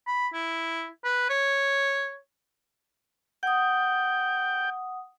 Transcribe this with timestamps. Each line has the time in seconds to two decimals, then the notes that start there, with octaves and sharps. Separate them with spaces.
0.07 B5
0.34 E4
1.04 B4
1.29 C#5
3.43 F#5 G5 D#6